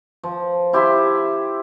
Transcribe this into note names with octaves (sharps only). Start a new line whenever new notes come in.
F3
E4 G4 E5 C6